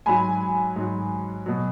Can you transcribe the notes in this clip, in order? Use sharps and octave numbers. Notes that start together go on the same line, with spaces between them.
G#2 F#3 G#5 B5
G#2 F#3
B2 F#3